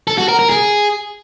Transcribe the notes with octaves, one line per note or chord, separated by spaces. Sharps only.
A4
F#4
A#4
A#4
G#4